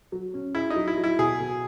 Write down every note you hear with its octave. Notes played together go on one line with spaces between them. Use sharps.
F#3
C#4
E4 G#4
D#4
F#3
E4
F#3
E4
B2 G#4
B2